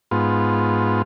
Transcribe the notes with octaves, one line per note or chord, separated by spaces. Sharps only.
G#2 B3 F4